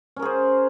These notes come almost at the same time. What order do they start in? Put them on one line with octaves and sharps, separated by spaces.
C#4 A#4 G#4 C5